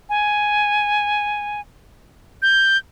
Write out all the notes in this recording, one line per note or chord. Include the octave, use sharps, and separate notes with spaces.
G#5
G6